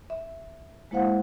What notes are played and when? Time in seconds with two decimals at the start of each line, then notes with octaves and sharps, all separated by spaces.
0.10 E5
0.91 G#3 A#3 E4 C5 F5 F#5